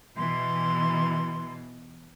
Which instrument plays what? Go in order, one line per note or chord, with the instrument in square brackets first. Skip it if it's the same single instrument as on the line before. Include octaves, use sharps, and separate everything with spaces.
[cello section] B2 E3 [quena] C6